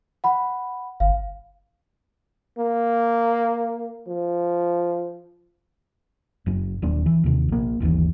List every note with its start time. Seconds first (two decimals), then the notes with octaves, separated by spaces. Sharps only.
0.24 F#5 B5
1.00 G1 F5
2.58 A#3
4.07 F3
6.46 F#1 F#2
6.82 D#1 F#3 A#3 D4
7.06 E3
7.24 D#2 C3
7.48 A#1 A#3
7.80 G1 D#2 C3 E3